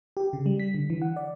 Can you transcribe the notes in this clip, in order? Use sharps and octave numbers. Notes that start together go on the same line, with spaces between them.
G4
C#3
G3
B6
D3
E3
F#5
D5